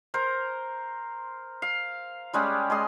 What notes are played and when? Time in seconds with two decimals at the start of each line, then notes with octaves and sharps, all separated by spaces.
0.14 A#4 C5
1.62 F5
2.33 G3 G#3 C#4 G4
2.70 G#3 D#5 C6